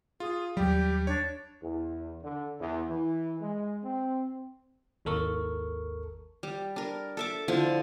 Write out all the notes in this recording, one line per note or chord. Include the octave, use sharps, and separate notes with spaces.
F4 G#4
D#2 F#3 G3 G4
D4 C#5
E2
D3
E2
E3
G#3
C4
G#1 D#2 A4 A#4 C#6
G3
D4 A#4
A4 E5 D6
D3 F3 E4 A5